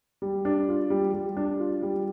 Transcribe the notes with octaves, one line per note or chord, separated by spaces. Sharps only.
G3
D4
F4
G3
G3
D4
F4
G3